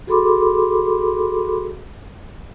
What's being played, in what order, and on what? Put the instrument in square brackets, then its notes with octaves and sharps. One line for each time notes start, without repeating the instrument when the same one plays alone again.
[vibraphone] F#4 G#4 A4 B5 C6 D6